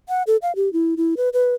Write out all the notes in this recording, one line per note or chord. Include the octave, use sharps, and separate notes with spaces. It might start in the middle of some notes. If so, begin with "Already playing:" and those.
F#5
A4
F5
G4
E4
E4
B4
B4